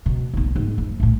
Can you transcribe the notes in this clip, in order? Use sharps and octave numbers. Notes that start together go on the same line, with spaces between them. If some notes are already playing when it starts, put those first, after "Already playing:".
B2
B1 B3
G#2
F2
A#1 A2